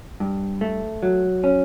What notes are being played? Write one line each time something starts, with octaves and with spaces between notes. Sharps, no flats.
G2
A3
F#3
C#4